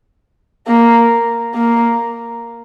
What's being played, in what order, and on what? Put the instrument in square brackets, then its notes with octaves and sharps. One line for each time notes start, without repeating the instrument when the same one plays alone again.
[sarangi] A#3
A#3